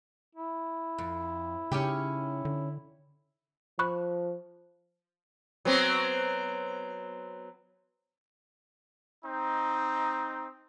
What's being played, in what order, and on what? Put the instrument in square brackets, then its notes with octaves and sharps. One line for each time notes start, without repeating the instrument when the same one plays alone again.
[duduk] E4
[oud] F2
[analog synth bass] C#3 [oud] C#4 D#4 G4
[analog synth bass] D3
[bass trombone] F3 [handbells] B5 C#6 F#6
[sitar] F#3 B3 C4
[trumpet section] C4 D#4